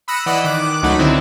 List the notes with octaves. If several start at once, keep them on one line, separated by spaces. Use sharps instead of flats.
B5 D#6 E6 F#6 A#6 C#7
E3 D5 D#5 F#5 B5 E7
D#3 D6 F#6
C#2 F#3 A3 D#4 F#5 B5
D3 D#3 C4 E4